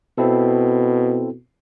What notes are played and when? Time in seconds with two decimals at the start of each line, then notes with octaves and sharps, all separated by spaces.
0.18 B2 C4 E4 A4